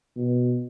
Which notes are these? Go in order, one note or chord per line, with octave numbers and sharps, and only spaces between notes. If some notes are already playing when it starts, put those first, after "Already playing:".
B2